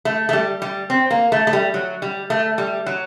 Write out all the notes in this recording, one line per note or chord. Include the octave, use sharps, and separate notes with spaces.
A3
A3
G3
G3
C4
A#3
A3
A3
G3
F#3
G3
A3
G3
F#3